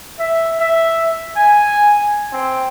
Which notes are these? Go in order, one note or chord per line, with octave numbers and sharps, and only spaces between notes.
E5
E5
G#5
C4